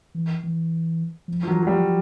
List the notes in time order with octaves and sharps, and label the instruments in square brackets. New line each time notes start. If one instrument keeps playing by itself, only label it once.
[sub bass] E3
E3
F3
[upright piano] F3
[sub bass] E3 [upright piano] F#3
[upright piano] F#3
[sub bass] F3 [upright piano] G3
[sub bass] F3